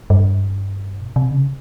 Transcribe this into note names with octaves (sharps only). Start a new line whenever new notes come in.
G2
B2
C3
C#3